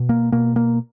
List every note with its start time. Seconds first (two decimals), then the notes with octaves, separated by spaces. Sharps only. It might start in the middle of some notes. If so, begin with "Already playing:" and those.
Already playing: B2
0.09 A#3
0.32 B2 A#3
0.56 A#3